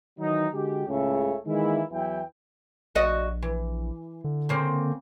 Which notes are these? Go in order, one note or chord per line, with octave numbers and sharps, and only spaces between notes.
D#3 E3 F#3 D#4
D3 G#3 F#4 G4
C#2 A2 C#3 A4 C#5 E5
D#3 E3 G#3 A#3 E4
E2 E3 F#3 E4 G5
A#1 F#4 D5 D#5
E3
D3
C#3 A#3 C4